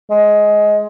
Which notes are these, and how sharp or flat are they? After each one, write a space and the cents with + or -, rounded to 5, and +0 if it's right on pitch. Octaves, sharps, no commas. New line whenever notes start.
G#3 +15